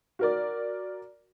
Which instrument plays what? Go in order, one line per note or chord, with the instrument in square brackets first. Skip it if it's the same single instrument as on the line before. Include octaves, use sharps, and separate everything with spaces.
[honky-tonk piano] F#4 A#4 D5